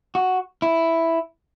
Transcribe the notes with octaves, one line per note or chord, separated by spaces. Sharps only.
F#4
E4